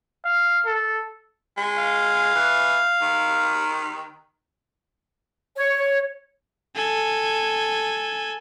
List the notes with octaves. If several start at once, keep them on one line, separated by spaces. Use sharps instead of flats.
F5
A4
G#3
F5
E3
D#3
C#5
A4 G#5